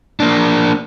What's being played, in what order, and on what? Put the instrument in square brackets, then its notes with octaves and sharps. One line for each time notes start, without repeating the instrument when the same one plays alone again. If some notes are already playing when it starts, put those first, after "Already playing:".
[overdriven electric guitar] A#3 D4